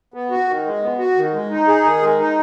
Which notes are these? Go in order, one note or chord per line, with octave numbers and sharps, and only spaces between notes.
B3
F#4
D#3
G#3
B3
F#4
D#3
G#3
D#4
G#4
D#3
G#3
D#4